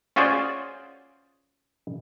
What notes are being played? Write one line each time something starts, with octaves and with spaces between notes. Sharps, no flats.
C#4 F4 F#4 G#4 C5 D5